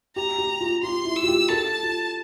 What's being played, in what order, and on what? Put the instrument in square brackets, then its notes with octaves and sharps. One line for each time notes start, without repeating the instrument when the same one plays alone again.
[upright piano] G4 [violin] A#5
[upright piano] G4
F4
[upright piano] F4 [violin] C6
[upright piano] E4
[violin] E6
[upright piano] F4
G4
[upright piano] A4 [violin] A5
[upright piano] F4